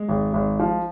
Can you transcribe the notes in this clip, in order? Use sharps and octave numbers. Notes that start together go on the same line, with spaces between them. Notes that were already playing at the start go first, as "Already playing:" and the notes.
Already playing: G#3
G#1
G#1
F3